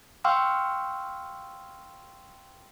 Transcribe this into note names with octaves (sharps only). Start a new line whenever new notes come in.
F5 G5 C6 C#6 E6 F6